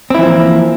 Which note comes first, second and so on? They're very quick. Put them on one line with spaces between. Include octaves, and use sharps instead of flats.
C4 E4 E3 F3 A#3